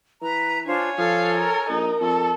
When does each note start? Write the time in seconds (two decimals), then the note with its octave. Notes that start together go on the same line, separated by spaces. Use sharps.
0.21 E3 B4 A#5
0.66 D4 F4 C5 C#5 G#5
0.98 F3 A4 F5
1.38 A#4
1.70 A#1 D#4 A#4
2.01 F2 A4